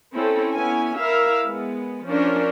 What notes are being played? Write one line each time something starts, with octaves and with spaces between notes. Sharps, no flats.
C4 C#4 E4 A4
B3 C#4 E4 G#5
E4 A#4 E5 F5
G#3 B3
F3 C#4 D4 A#4